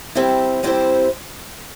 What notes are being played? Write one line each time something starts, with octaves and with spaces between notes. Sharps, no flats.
G3 C4 E4 G4 C5
G3 C4 E4 G4 C5